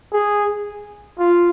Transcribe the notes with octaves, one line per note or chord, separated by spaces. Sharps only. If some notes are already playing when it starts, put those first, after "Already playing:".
G#4
F4